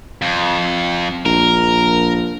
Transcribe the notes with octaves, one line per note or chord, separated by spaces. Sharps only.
F2
A#1 A#4